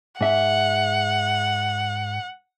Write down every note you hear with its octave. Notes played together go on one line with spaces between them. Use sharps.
G#2 E5 F#5